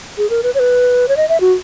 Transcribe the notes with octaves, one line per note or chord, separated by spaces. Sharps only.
G#4
A#4
B4
C#5
B4
C#5
D#5
E5
F#4